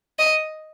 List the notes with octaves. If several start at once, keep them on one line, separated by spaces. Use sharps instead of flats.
D#5